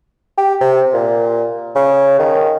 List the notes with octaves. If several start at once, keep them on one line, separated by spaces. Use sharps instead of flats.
G4
C3
A#2
C#3
D#3